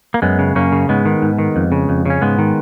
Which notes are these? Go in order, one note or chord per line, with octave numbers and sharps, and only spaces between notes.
A#3
F#2 G#3 B3
C#3
F#2 A#3 C#4
C#3
G#2 G#3 B3
D#3
G#2
D#3
F2
C#3
F2
C#3 C#4
G#2 G#3 B3
D#3